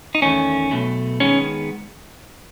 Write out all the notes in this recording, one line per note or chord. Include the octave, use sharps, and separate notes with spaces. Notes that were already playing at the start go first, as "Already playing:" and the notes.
D#4
E2 D#3 A3 C#4
B1 B2 A3
D#3 G#3 B3 C#4